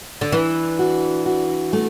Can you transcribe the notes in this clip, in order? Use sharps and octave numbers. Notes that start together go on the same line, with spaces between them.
D3
E3 D4
F#4
F#4
A3